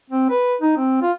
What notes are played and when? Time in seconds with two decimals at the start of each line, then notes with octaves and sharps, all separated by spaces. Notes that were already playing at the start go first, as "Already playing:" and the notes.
0.10 C4
0.30 B4
0.62 D#4
0.77 C4
1.02 F4